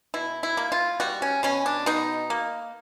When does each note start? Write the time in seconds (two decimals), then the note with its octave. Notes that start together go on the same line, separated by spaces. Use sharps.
0.14 B2 E4
0.43 E4
0.57 A#3
0.72 F4
1.00 G3 F#4
1.22 C#4
1.43 B2 C#4
1.66 D4
1.86 B2 D#4
2.30 A#3